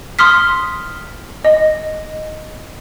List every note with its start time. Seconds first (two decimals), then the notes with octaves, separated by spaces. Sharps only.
0.19 C6 D#6 F6 B6
1.44 D#5